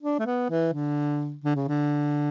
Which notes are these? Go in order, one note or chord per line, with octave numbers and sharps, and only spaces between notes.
D4
A3
B3
E3
D3
D3
C#3
D3